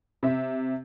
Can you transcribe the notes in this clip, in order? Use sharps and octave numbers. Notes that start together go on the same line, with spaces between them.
C3 E5